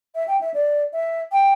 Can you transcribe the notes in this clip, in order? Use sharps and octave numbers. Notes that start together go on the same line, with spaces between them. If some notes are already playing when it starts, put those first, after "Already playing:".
E5
G5
E5
D5
E5
G5